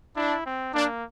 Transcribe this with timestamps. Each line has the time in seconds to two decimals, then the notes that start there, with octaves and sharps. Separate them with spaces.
0.17 D4 E4
0.46 C4
0.74 A#3 D4